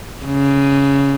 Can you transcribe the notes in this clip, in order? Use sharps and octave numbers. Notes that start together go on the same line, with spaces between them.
C#3